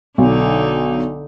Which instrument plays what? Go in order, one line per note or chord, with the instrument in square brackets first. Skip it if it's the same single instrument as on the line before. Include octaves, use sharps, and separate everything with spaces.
[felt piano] B1 [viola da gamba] D3 D#4